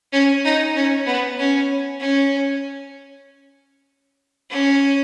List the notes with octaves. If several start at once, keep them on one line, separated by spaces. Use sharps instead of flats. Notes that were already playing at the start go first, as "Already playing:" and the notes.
C#4
D#4
C#4
B3
C#4
C#4
C#4